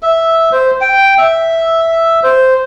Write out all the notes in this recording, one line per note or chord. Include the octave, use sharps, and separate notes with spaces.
E5
C5
G5
E5
C5